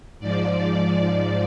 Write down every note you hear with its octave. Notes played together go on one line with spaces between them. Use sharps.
G#2 F3 D5